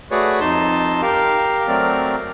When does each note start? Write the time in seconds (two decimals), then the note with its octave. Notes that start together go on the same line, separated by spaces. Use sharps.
0.11 A3 F#4 G#4 B4 C#5 D5
0.40 F2 D#4 A5 C6
1.02 G4 A#4 F5
1.68 F#3 A3 C4 A#4 D5 F6